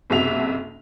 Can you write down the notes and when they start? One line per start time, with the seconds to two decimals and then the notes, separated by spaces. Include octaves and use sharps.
0.10 F#1 B1 C3 F#4 E5 F7